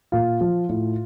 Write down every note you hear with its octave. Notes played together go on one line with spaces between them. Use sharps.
A#2 F4
F3
A2